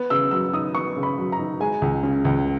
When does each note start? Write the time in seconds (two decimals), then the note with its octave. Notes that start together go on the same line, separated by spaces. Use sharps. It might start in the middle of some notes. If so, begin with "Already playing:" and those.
Already playing: B3
0.10 C#3 E6
0.31 F#3 E6
0.53 D#4 D#6
0.75 B3 C#6
0.96 C#3
1.03 B5
1.18 F#3
1.32 A#5
1.39 D#4
1.60 G#3 G#5
1.82 C#2
2.03 C#3
2.25 C#2